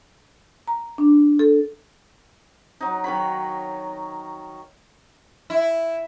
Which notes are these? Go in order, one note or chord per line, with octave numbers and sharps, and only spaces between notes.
A#5
D4
A4
F#3 D#4
D#3 F#3 C#5 B5
E4